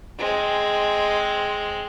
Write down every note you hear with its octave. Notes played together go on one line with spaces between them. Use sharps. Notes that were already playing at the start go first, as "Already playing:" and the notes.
G#3 C4